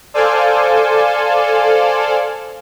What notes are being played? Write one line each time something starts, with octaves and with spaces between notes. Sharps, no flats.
A4 C5 D5 F5 G#5